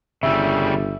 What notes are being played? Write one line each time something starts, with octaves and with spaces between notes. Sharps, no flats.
G1 C#3 G3 E5